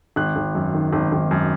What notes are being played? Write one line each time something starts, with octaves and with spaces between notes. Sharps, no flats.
G#1 F#6
G#1
F#2
D#3
G#1
G#1
F#2